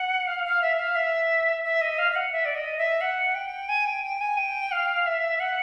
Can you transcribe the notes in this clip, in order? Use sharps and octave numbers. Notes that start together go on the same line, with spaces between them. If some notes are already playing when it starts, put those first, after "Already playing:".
Already playing: F#5
F5
F5
E5
F5
E5
E5
D#5
F5
F5
F#5
E5
D5
D#5
E5
F#5
G5
G#5
G5
G5
G#5
G5
F5
E5
F#5